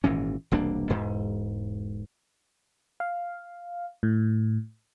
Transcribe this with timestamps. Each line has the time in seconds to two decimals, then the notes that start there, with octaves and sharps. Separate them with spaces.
0.04 G#1 A#2 E3 C#4
0.51 E1 C2 A#3 D4
0.90 E1 G#2
3.00 F5
4.03 A2